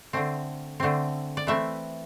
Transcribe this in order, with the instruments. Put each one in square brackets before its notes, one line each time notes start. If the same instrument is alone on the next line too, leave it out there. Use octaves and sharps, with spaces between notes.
[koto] D3 A3 C4
D3 A3 C4
D5
E3 A3 C4 E5